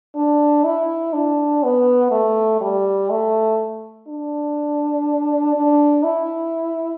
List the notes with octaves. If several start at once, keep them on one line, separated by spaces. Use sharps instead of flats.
D4
E4
D4
B3
A3
G3
A3
D4
D4
E4